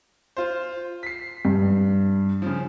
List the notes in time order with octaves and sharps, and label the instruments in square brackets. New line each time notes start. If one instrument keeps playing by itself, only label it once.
[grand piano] F4 C5
B6 C7
[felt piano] G2
[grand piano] C#3 F3